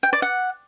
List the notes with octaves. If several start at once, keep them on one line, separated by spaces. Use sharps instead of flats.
G5
D5
F#5